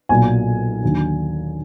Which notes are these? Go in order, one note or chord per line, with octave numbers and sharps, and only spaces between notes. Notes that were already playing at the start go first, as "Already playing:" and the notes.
B1 A#2 F#3 G#5
D#2 D3 F#3